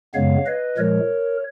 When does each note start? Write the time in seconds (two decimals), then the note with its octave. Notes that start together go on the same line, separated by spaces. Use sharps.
0.14 F#2 C#3 G#3 B3 C#5 F5
0.46 B4 D#5
0.77 A#2 F3 G#3 A#4 C#5